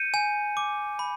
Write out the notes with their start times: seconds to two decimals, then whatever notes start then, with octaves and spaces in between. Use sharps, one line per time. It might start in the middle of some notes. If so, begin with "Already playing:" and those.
Already playing: G6 C#7 D#7
0.14 G#5
0.57 D6
0.99 B5